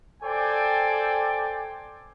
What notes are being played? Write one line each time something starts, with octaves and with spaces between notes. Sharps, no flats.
A4 C5 D5 G5 G#5